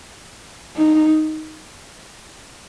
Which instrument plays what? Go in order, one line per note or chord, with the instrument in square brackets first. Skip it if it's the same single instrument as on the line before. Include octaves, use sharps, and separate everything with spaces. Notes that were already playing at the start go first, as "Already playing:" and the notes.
[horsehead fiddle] D#4